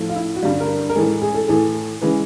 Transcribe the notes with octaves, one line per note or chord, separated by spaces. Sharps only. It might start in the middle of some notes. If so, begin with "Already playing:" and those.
Already playing: A2 F3 A3
F4
E4
F#4
G2 D3 G3 F4
A#4
A#4
A2 E3 G#3 A4
G#4
A4
A2 E3 A3 G#4
C#3 E3 G#3 B4